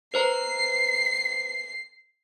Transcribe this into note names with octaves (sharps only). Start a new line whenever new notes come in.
B4 C5 A#5 C7